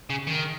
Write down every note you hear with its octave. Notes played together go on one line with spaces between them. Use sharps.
C#3
D#3